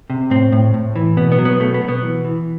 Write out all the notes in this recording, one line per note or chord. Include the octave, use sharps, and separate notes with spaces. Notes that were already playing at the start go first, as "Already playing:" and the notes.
C3
A2 C4
A2
A2
E3
B2 B3
B3
F#3
B3
B2 A3
B3
B2
B3
E3
E3